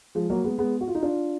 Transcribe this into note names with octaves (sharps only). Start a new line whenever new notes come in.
F3 G#3
F#3 A#3
G#3 B3
G#3 B3
F#4
F4
D#4
D4 F4